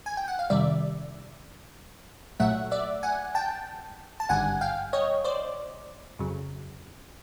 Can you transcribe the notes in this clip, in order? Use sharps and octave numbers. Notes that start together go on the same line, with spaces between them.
G#5
G5
F#5
F5
F2 C3 D#3 G3 D5 E5
B1 A#2 F#3 A3 E5 F#5
D5 E5
F#5 G#5
G5 A5
A5
G#1 G2 D3 G3 F#5 G#5
F5 G5
C#5 D#5
C5 D5
F2 C#3 F#3